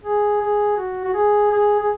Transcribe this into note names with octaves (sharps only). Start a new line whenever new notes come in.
G#4
G#4
F#4
F#4
G#4
G#4
G#4